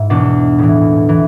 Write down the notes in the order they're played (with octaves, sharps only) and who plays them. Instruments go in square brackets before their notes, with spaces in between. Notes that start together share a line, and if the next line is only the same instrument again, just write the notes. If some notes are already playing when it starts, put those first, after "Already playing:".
Already playing: [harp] G#2 E4
E2 B2 D4
A2 E3
E3